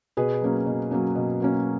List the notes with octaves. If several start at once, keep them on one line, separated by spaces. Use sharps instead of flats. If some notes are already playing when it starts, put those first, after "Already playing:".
B2 G#4 B4
F#3 A#3 C#4
B2
F#3 A#3 C#4
B2
F#3 A#3 C#4